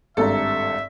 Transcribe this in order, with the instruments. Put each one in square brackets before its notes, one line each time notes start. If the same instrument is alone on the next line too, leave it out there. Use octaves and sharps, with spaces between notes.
[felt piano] G#1 G2 A#5 [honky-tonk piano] A4 [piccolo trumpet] E5